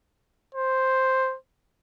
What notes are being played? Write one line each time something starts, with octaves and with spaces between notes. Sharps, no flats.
C5